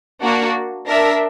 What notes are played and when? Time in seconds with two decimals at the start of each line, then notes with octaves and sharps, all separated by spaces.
0.24 A#3 D4 F#4
0.87 D4 A#4 E5